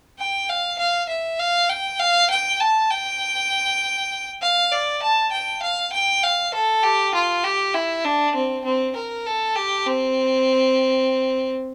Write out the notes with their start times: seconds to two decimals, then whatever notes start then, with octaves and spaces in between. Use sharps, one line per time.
0.19 G5
0.49 F5
0.79 F5
1.09 E5
1.39 F5
1.69 G5
1.99 F5
2.30 G5
2.60 A5
2.91 G5
4.42 F5
4.72 D5
5.02 A5
5.32 G5
5.62 F5
5.93 G5
6.23 F5
6.54 A4
6.83 G4
7.15 F4
7.44 G4
7.74 E4
8.05 D4
8.35 C4
8.64 C4
8.96 A#4
9.26 A4
9.56 G4
9.86 C4